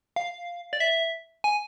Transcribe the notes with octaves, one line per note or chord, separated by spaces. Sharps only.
F5
D5
E5
G#5